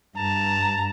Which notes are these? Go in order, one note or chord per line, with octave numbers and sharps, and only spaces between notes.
G2 A5 A#5